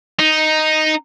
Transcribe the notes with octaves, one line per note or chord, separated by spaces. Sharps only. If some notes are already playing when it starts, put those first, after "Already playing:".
D#4